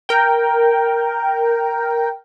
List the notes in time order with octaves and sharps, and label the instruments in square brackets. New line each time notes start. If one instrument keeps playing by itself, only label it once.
[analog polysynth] A#4 G5